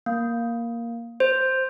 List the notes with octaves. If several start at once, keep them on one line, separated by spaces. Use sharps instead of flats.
A#3
C5